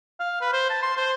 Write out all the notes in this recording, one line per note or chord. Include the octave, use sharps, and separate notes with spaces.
F5
B4
C5
A5
C6
C5